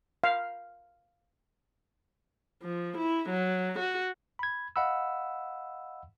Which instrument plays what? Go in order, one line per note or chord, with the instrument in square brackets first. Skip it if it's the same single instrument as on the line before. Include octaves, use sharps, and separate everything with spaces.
[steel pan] F5
[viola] F3
E4
F#3
F#4
[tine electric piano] B5 G#6
D#5 F5 F#5 B5 E6